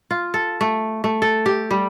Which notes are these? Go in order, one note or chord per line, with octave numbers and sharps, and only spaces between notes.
F4
A4
A3
A3
A4
G4
G3